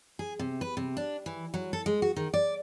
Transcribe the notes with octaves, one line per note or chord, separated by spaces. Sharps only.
G#4
C3
B4
C3
D4
E3
F#3
A4
G#3
F#4
D#3
D5